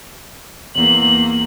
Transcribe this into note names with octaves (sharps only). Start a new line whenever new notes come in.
E2 A#3 F#7